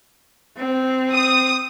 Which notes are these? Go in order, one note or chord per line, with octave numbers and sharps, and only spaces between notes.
C4
D#6